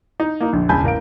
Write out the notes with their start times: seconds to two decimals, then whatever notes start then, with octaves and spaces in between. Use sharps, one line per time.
0.20 D#4
0.40 A#3 D#4
0.52 A#1 F2 D3
0.69 E1 C#2 G#5 A5 B5 G6
0.83 A1 A#4 F5 D7